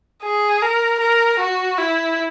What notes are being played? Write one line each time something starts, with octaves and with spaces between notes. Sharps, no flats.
G#4
A#4
A#4
F#4
E4